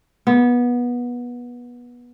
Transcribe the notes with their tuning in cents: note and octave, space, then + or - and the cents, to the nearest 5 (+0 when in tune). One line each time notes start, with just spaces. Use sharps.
B3 -20